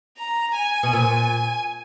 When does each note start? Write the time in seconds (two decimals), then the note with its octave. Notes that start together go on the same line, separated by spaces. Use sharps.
0.17 A#5
0.55 G#5
0.83 B2
0.93 A#2